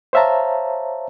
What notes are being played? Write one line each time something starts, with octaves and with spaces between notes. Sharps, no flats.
C5 C#5 E5 F5 A5 A#5